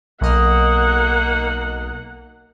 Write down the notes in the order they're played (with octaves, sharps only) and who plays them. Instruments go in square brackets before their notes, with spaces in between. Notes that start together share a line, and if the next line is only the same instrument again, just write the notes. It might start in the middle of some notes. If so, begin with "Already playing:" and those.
[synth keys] B1 D#5 F6 [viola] A#3 F#5